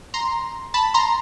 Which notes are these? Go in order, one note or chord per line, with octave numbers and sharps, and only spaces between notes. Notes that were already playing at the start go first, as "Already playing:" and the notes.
A#5 C6
A5 B5
A#5 C6